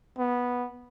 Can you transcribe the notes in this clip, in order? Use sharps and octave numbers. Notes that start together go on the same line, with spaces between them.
B3